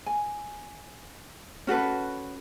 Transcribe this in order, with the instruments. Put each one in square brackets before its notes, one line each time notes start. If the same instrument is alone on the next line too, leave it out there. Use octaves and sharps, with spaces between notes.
[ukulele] G#5
C#4 F#4 A4 B4